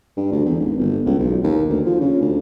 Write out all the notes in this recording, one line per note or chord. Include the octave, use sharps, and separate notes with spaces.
G2
D2
E2
G#1
G1
C#2
B1
D#2
D2
F3
C#3
D2